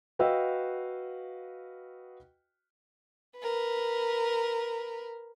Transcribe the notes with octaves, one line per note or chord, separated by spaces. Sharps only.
F#4 B4 D#5 F5 G5 E6
A#4 B4